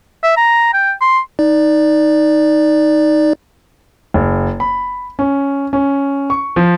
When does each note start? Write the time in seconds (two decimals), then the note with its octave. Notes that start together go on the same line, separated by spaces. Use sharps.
0.23 E5
0.37 A#5
0.74 G5
1.01 C6
1.39 D#4 D5
4.14 F#1
4.60 B5
5.19 C#4
5.73 C#4
6.30 C#6
6.56 F3